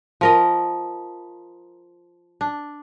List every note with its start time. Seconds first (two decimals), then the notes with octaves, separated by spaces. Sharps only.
0.21 F3 A#4 D#5
2.41 D4